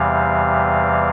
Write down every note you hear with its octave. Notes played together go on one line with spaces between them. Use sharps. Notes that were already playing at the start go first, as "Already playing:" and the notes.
Already playing: E2 C3 E3 G3 F5